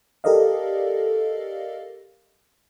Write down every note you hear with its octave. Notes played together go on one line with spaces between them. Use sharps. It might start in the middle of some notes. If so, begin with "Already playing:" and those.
G4 A4 A#4 D5 D#5 F5